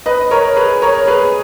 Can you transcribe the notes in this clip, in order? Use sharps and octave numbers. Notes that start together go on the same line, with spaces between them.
B4 D#5
A#4 C#5
G#4 B4
A#4 C#5
G#4 B4